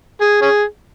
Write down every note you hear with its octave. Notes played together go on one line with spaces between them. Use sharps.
G#4
C#4 G#4